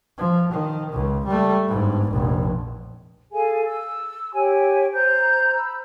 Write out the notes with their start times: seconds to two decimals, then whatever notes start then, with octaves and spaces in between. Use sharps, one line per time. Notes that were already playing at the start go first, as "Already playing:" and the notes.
0.18 F3
0.51 D#3
0.92 C#2
1.26 G3 A3
1.68 G1 G#2
2.10 F1 A#1
3.31 G#4 A4 F5 G#5
3.65 E6
4.33 G4 C#5 G5 G#5
4.92 C5 A#5 G6
5.55 B5 E6